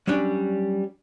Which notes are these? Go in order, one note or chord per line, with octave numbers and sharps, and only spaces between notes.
F#3 G3 C#4 D4